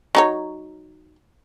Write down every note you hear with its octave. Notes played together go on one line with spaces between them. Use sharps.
F#3 D#4 C#5